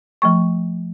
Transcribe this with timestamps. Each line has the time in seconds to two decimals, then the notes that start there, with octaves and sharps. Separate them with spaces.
0.22 F3 A3 C#6